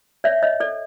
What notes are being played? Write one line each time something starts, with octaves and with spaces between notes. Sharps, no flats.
C#5 D5 E5
C#5 D#5
A4 D5